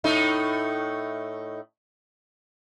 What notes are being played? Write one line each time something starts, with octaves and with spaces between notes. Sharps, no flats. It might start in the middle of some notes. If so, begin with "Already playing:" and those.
A2 A3 D#4